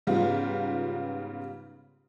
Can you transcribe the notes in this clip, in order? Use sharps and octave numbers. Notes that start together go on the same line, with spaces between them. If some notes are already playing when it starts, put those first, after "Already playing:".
G#2 C#3 G3 B3 F4